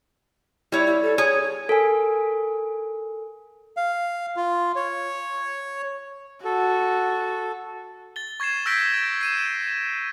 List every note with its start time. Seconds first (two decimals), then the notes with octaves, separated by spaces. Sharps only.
0.72 G3 E4 C#5
0.87 E4
1.03 A4
1.18 G#4 C#5
1.69 A4 A#4 G#5
3.77 F5
4.36 F4
4.76 C#5
6.45 F#4 A4
8.16 A6 G7
8.40 C#6 G#6 A6 C7 E7
8.66 E6 F6 G6 A#6 B6 D7
8.94 A6
9.21 C7 D#7 E7